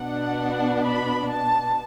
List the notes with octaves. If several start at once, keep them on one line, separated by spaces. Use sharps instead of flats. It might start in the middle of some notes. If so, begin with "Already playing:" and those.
Already playing: B2 B3 D4 F#5
B5
A5